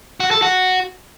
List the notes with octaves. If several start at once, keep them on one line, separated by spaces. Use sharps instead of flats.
F#4
A4
F#4